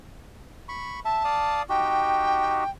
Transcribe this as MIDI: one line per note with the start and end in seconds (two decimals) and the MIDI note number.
0.69 1.00 83
0.69 1.00 85
1.05 1.23 76
1.05 1.62 81
1.24 1.63 74
1.24 1.63 77
1.24 1.63 87
1.69 2.64 63
1.69 2.64 66
1.69 2.64 67
1.69 2.70 79